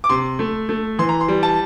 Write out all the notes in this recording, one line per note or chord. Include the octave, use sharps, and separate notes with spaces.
D6
C3 C6
A3
A3
E3 C6
A#5
C6
G3
A5